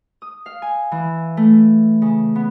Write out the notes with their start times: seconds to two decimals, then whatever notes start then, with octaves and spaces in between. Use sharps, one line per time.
0.22 D#6
0.46 F5
0.62 G#5
0.92 E3
1.37 A3
2.02 C#3
2.36 B3